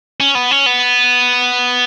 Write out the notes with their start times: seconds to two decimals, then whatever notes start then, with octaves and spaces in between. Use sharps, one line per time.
0.20 C#4
0.35 B3
0.51 C#4
0.66 B3